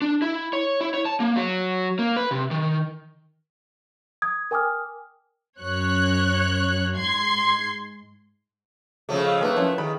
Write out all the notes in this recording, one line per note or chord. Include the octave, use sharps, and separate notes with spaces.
D4
E4
C#5
E4
C#5
A5
A#3
F#3
A#3
B4
C3
D#3
D#6 G#6
A#4 G5 G#5 D6 D#6 F6
F#2 C#5 F#6
G#2 C6 G#6 C7
C#3 F3 A3 G#4 C#5
D#5 F5 E6
G3 A3 A#3 D#4 A#4 B4 G5
F3 C#4 E4
D#3 E4 G#4 B5